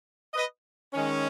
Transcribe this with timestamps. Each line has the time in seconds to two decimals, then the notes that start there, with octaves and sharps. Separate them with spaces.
0.34 B4 D#5
0.93 D#3 G#3 C#4